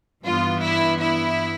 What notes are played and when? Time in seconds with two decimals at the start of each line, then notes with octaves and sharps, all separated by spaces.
0.23 G2 E3 B3 F4
0.60 E4
0.98 E4